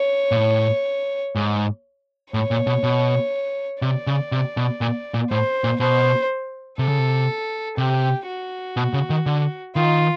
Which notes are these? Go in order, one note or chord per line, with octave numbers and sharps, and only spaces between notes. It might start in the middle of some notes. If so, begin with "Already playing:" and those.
Already playing: C#5
A#2
A2
G#2
A2 C#5
A#2
B2
B2
C3 D5
C#3
C3
B2
A#2
A#2
A2 C5
A#2
B2 C5
C3 A4
C#3
C3
C3 G4
F#4
B2
C#3
D#3
D3
D#3 F4